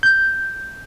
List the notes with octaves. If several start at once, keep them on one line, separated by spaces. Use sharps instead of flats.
G6